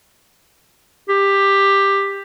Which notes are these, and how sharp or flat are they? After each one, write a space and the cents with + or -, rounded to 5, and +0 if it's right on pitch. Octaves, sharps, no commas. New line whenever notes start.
G4 +10